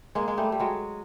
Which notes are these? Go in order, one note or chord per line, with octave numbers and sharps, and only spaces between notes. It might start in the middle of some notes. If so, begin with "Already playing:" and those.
G#3 A#3
G#3
G3 A3
G3
F#3 G#3